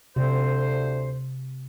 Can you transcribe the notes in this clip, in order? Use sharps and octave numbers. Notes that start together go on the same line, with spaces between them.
D2 C3 C5